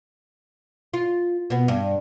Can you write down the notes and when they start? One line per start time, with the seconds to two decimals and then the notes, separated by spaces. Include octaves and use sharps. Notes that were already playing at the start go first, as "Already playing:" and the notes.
0.93 F4
1.50 B2 B3
1.68 G2